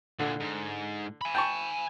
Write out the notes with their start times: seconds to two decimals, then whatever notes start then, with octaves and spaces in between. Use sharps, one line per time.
0.19 A#2 D3 A3
0.40 G#2
1.22 G#5 B5
1.35 G5 A5 C#6